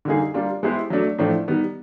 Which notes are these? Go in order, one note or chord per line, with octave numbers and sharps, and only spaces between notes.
D3 G3 A#3 D#4 G#4
G3 A#3 D4 F4
G#3 B3 E4 G4 C5
F#3 A3 D4
A2 F3 A3 D4
D#3 G3 B3